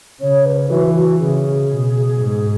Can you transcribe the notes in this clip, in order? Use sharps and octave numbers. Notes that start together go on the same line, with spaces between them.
C#3 C#5
B4
E3 F#4
F#4
C#3 G#4
B2
G#2